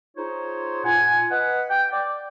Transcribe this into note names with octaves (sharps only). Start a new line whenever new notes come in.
D#4 F4 G#4 C5 C#5
A#2 F#5 G#5
B4 D#5 F#5
G5
D5